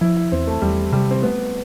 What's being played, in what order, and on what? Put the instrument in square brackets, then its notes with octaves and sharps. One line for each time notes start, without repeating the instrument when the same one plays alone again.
[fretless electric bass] F3 [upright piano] E4
[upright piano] E4
[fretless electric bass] E2 [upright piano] C4
[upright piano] A3
[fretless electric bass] E2 [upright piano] G3
[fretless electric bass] C3 [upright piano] G3
[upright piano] C4
[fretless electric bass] A3 [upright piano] B3